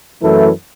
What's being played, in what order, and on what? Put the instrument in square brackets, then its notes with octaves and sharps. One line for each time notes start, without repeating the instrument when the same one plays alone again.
[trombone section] F#2 E3 A3 E4 A4